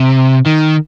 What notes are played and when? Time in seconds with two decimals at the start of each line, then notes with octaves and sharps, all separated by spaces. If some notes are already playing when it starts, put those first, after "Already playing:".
Already playing: C3
0.46 D#3